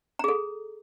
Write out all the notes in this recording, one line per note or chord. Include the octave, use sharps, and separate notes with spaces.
G#4 A4 A#5